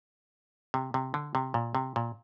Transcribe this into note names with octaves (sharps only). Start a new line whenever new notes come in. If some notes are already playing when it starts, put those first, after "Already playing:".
C3
C3
D3
C3
A#2
C3
A#2